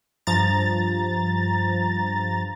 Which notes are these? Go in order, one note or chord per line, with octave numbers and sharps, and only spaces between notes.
G2 F3 A#5 A6